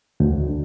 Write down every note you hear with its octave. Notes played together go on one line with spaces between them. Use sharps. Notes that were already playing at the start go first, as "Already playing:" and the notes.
D2